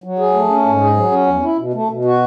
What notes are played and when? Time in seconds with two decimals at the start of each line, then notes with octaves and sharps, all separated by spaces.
0.04 F#3
0.19 G#4
0.34 A3
0.49 C#4
0.66 G#2
0.81 G#4
0.96 F#3
1.11 C#4
1.27 E2
1.43 E4
1.58 B2
1.74 A3
1.89 B2
2.05 F#4